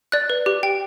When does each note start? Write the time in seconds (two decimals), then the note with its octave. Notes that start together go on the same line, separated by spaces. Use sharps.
0.12 D5 F#6
0.30 B4
0.46 G4
0.63 G5